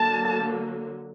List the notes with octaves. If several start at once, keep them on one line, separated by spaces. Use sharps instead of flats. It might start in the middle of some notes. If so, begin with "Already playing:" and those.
Already playing: D3 F#3 A#3 A5